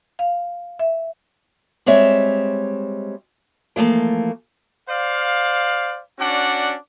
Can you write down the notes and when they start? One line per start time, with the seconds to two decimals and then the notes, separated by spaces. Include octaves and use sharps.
0.19 F5
0.79 E5
1.86 G3 G#3 C4 C#5 E5
3.76 E3 F3 A3 A#3
4.89 C5 D5 F5
6.19 C#4 D4 F#4 D5 F#5